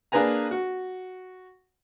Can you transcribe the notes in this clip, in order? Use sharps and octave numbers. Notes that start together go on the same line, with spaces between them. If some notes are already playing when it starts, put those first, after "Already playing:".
A#3 D4 G#4 B4 G#5 A#5
F#4